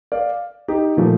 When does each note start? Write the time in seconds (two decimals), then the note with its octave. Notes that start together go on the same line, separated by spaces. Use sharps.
0.12 D5 F5
0.68 D#4 G4
0.97 A#2 F3 A3